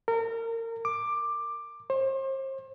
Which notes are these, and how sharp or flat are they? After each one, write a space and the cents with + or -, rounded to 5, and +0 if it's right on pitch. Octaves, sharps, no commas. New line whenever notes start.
A#4 -30
D6 +10
C5 +40